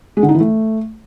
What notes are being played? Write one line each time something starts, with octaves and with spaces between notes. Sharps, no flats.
G#3
D3
D#4
E3
A3